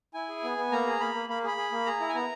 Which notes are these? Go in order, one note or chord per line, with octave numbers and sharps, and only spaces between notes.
E4 G#5
G#4
B3
B3
A#3 A#5
G#4
A#3 B5
A#3
A#3 B5
G#4 B5
G#4
A#3
G#4 A#5
E4
G#5
B3 A#5